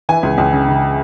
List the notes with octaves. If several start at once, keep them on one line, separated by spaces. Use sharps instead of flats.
E3 G#5
C#2
C#2
C#3
C#3